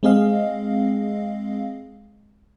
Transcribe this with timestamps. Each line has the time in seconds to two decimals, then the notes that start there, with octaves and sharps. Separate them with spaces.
0.03 G#3 C4 G#4 D#5 F5